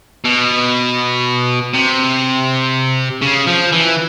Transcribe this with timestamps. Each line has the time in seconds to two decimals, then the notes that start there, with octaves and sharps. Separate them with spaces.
0.25 B2
1.74 C3
3.22 C#3
3.47 F3
3.72 E3